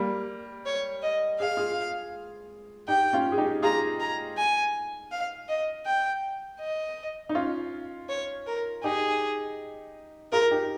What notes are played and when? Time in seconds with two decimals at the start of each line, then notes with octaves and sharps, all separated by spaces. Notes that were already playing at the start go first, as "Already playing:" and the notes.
Already playing: G3 A#3
0.66 C#5
1.03 D#5
1.40 G#4 F5
1.57 F4 G#4
2.88 D#4 G4 G5
3.13 C#4 F4
3.32 G#4
3.38 D#4 G4
3.62 F4 G#4 A#5
4.00 A#5
4.37 G#5
5.12 F5
5.49 D#5
5.86 G5
6.60 D#5
7.29 D#4
7.35 C#4 F4
8.09 C#5
8.47 A#4
8.83 D#4 G4 G#4
10.32 F4 G#4 A#4
10.51 D#4 G4